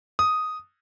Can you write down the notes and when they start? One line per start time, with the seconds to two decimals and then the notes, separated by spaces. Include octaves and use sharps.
0.19 D#6